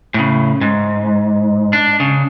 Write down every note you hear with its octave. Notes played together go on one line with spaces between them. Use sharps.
A2 C#3
G#2
D4
C#3